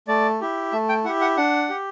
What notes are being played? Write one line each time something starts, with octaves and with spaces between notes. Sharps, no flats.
A3 D5
E4 G4
A3 E5
G5
E4 G4 F#5
F#5
D4 F#5
G4